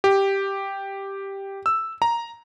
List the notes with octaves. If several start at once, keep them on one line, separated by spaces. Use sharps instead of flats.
G4
E6
A#5